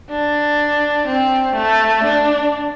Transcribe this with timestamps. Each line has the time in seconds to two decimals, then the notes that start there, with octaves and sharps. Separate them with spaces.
0.10 D4
1.07 C4
1.55 A3
2.04 D4